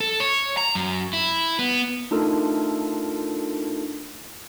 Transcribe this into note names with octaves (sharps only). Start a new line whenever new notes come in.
A4
C#5
A#5
F#2
E4
B3
A3 D4 D#4 F4 A4 A#4